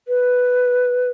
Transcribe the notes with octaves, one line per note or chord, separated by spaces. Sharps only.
B4